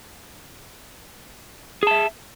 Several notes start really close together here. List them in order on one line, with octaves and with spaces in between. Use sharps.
G#4 A5 E5